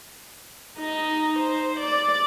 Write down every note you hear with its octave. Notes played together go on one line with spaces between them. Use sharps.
D#4 D#5
C5
D5